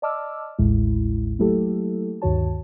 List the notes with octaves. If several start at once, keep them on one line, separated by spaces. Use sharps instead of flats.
D5 D#5 A5 D6 E6 F6
A1 D#2 A2 G#3 E4
F#3 A3 A#3 E4 G4 A4
D2 G2 D#3 F#4 C#5 A5